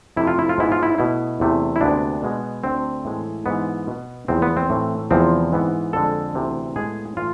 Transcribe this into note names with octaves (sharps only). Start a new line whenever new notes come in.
F2 C3 F3 A3 E4
F4
E4
F4
G#2 G#3 B3 E4
F4
E4
B2 A3 E4
E2 C3 E3 A3
E4
D2 C3 G#3 B3 D4
B2 G#3 B3
D2 D3 A3 C4
A2 E3 G#3
G#2 E3 G#3 B3
B2 B3
E2 C3 F3 B3 C4
B3
C4
A2 E3 A3
E2 C3 F3 G#3 C4
G#2 E3 B3
F2 D3 G#3 A4
D2 C3 E3 B3
A2 G#3 B3 G#4
A2 E3 F4